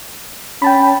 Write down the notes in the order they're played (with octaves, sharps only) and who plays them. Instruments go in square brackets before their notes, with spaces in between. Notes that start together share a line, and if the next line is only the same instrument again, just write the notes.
[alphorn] C#4 [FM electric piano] G5 A5 B5